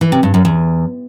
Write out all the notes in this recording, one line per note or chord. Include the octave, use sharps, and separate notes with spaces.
E3
C3
G2
F#2
E2